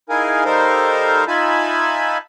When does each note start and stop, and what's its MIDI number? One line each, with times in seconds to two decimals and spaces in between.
0.09 0.44 63
0.09 0.44 64
0.09 0.44 68
0.09 0.44 70
0.09 0.44 77
0.09 0.44 80
0.45 1.25 55
0.45 1.25 63
0.45 1.25 69
0.45 1.25 70
0.45 1.25 72
0.45 1.25 77
1.28 2.18 63
1.28 2.18 65
1.28 2.18 76
1.28 2.18 80
1.28 2.18 81
1.28 2.18 83